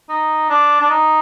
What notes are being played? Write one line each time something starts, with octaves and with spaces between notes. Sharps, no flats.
D#4
D4
D4
D#4